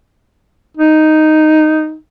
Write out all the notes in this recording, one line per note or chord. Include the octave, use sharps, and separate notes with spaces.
D#4